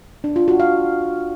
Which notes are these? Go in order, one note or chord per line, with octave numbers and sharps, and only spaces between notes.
D4
F4
F#4
F5